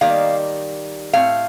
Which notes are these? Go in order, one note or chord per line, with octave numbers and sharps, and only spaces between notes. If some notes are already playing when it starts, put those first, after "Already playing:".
D#3 G3 A#3 F5
A2 A3 C4 F5